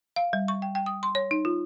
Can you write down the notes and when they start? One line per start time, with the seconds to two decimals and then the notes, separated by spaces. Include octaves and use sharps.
0.16 F5
0.33 G3
0.48 C#6
0.62 G5
0.75 G5
0.86 D#6
1.03 C6
1.15 C#5
1.31 D#4
1.45 F4